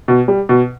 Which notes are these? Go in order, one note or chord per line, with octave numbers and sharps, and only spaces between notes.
B2
G3
B2